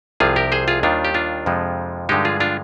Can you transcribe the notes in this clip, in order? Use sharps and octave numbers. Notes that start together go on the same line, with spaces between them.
C2 C3 F3 F4 G#4
G4 A#4
G#4 C5
F4 G#4
D#2 D#3 G3 D4 F4
G4
D4 F4
F2 C3 F3 G#3
G2 D3 F3 G#3 D#4 G4
F4 G#4
D4 F4